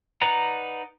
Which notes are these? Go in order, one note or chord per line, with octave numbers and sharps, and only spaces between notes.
D#4 B4 D5 F#5 A#5